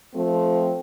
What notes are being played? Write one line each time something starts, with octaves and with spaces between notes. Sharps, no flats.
F3 A3 C4